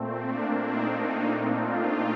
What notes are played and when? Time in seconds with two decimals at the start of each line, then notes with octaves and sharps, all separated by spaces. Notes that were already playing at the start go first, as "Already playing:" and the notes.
Already playing: A#2 A3 C4
0.31 A#3 D4
0.72 C4 D#4
1.56 D4 F4